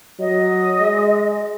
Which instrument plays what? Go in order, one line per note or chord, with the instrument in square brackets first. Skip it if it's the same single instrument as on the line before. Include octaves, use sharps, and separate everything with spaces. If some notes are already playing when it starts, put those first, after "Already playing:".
[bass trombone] F#3 [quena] D#5
[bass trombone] G#3